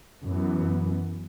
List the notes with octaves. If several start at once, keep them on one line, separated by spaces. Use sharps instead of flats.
F#2 E3 B3